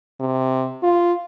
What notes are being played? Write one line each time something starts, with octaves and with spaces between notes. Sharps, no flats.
C3
F4